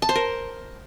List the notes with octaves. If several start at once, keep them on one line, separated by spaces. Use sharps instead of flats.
A5
C5
A#4